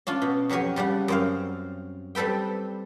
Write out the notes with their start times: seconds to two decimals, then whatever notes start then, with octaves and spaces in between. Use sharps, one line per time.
0.07 C#4 D4 F4
0.22 B2
0.49 F2 F#3 G4 C#5 G#5
0.76 C#3 G3 D4 F#5
1.08 F#2 C4 F5
2.15 G3 C4 A4 B4 G5